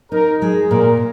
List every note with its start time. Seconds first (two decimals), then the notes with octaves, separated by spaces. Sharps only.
0.12 D#4 A#4
0.41 G#3 G#4
0.71 A#2 A#4